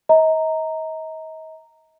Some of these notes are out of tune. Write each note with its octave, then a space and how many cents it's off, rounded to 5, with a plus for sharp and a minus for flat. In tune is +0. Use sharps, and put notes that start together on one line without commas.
D#5 +40 A#5 -10